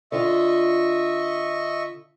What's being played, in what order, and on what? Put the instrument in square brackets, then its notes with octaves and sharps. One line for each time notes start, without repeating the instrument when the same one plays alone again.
[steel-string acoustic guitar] D3 F4 [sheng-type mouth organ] D#5 E5 C#6